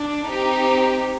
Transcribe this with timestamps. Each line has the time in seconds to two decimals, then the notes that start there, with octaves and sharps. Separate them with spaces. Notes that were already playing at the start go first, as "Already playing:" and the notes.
Already playing: D4
0.26 C4 D#4 G4